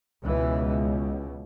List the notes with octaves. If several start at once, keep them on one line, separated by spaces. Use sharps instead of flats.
C#2 B2 E3